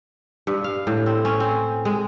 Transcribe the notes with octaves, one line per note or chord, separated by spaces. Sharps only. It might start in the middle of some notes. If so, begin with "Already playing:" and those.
G2
F5
A2
C4
C#4
C4
G#3